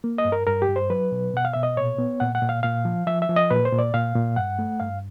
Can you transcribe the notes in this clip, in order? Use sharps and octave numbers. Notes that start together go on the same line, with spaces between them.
A#3
D#5
G2
A#4
G2 A#4
G4
G2
C5
F#3 B4
B2
B2 F#5
F5
B2 E5
D#5
A#2 C#5
B3
A#2 F#5
F#5
A#2
F5
A#2 F5
F3
F3 E5
E5
F3
D#5
A#2 B4
C5
A#2
D5
A#2 F5
A#2
G2 F#5
A3
G2 F5